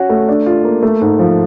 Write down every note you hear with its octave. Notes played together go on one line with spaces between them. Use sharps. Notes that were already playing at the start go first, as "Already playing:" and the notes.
Already playing: C#4 F#4
A3
D4
F4
A#3
A3
G#2
F3